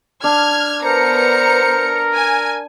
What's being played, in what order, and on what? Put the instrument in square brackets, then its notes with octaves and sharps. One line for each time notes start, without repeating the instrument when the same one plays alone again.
[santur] D4 [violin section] F6 G#6
[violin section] B3 A#5 C#7 [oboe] A#4 [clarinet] C5
[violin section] G#5